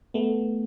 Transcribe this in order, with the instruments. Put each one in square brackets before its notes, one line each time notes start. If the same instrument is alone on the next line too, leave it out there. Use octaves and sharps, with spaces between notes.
[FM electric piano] A3 B3